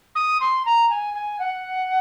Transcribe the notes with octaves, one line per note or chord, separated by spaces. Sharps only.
D#6
C6
A#5
G#5
G#5
F#5